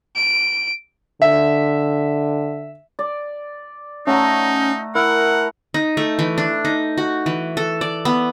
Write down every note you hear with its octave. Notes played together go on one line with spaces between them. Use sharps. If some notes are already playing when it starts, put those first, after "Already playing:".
D7
D3 E5
D5
A3 C#4 D#4 F#5 A#5
E4 A#4 F#5
D#4
A3
E3
D4
D#4
F#4
E3
A4
D5
B3